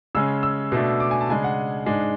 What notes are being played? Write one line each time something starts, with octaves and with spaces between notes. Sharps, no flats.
C#3 G#3 C#4 E6
E6
B2 A3 D4
D6
G#5
A5
C#3 G#3 D4 G#5
F#5
G#2 G#3 D4